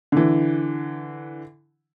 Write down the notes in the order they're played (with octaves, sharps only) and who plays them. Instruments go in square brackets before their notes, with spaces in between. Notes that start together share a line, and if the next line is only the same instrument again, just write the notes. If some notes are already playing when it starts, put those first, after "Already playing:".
[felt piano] D3 E3